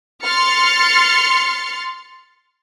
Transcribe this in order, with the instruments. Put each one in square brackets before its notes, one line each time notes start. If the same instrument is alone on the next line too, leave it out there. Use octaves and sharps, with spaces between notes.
[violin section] C6 F6 A6 C#7